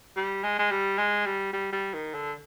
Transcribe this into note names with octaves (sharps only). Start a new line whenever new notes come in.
G3
G#3
G#3
G3
G#3
G3
G3
G3
D#3
D3